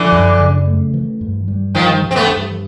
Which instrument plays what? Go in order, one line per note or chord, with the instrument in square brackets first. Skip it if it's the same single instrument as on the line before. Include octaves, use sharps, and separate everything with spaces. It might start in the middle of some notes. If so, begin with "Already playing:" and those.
Already playing: [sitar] D3 E3 [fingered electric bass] F3
[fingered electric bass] F#2
C#3
A3
E3
G2
G3
[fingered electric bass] G2 [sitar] D#3 F3
[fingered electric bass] E3
[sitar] C4
A3 B3
[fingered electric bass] G2